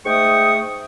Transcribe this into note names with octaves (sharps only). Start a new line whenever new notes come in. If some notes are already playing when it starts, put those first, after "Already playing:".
G#2 A3 G5 C#6 D#6